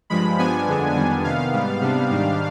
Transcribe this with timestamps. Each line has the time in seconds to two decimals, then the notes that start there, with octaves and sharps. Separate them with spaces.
0.10 G2 F3 G#3 B5
0.39 G2 F3 B3 D4 G#5
0.68 F2 D3 G#3 B3 D4
0.95 F2 D#3 G3 B3 D4
1.24 C3 D#3 B3 F5
1.53 G#2 G3 B3
1.81 C3 G3 B3 D4
2.11 G#2 D#3 G3 D4